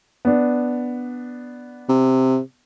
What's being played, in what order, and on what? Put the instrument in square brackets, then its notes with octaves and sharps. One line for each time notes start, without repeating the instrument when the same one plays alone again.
[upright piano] B3 D4
[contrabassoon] C3